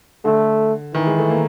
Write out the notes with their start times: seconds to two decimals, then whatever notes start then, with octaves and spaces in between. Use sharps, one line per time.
0.25 D3 A3
0.94 D#3 E3
1.06 G#3
1.19 A3
1.30 A#3